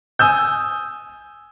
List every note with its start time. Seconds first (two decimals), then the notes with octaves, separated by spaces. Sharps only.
0.19 G#5 D#6 E6 G6